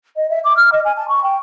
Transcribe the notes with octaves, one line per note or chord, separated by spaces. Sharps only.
D#5
E5
D6
F6
D#5
G#5
A5
C#6
G5